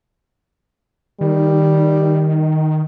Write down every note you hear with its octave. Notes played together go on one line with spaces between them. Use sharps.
D#3 G3